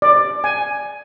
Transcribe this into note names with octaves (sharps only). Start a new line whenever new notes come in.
D5
G#5